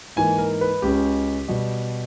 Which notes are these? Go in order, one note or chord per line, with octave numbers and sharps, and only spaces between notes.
G#2 E3 A#3 G#5
A#4
B4
C#2 C#3 G#3 C#4 G4
B2 G3 B3